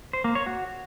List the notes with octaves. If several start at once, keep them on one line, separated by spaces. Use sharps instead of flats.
C5
A#3
C#5
F#4